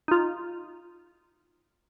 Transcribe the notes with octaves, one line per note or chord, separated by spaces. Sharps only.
D#4 F4